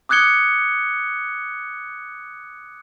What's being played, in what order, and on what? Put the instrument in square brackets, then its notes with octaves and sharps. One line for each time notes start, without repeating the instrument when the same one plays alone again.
[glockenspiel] D6 D#6 F#6 G#6 C#7 G7